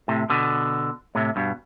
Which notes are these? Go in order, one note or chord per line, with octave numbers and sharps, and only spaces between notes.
A2 C3
B2 D3
A2 C3
G2 B2